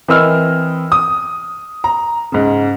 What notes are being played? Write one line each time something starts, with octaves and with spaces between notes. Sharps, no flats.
E3 C4 A#4 D#5 E6 F6
D#6
A#5
G#2 C#3